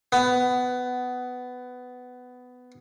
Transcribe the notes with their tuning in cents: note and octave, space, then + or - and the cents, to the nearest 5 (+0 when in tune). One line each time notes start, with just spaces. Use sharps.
B3 +15